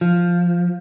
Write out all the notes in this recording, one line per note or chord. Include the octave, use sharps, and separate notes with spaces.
F3